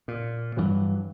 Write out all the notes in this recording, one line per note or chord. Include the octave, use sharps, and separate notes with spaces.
A#2
G2 E3 F#3